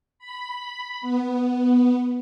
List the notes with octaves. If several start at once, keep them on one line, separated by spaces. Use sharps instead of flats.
B5
B3